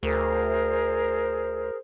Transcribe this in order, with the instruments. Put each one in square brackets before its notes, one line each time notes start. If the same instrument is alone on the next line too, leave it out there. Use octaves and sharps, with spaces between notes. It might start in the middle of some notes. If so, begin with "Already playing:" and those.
[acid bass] D2 [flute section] G#4 A#4 C5